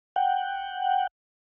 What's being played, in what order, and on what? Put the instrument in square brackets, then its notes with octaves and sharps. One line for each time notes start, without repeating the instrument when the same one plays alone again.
[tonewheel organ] F#5 G5